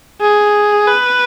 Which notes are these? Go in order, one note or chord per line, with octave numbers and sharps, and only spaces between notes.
G#4
B4